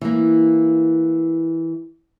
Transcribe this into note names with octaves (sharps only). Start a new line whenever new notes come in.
E3 A#3